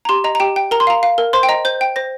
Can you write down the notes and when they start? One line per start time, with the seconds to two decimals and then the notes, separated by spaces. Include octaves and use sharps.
0.05 A#5
0.09 G4 C6
0.24 D#5 A#5
0.35 A#5
0.40 G4 G5
0.56 G5
0.71 A#4 A#5
0.80 C6
0.87 F5 A#5
1.03 F5
1.18 A#4
1.33 C5 C6
1.43 G5
1.49 D#5 A#5
1.65 C5 G6
1.81 G5
1.96 C5 A#6